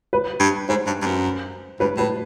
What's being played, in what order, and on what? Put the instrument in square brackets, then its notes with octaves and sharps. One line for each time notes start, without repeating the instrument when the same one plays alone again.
[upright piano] B4
[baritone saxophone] G2
[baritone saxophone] G#2 [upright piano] C5
[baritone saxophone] G2
G2
F#2
[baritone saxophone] G2 [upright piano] B4
[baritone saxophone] A2 [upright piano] B4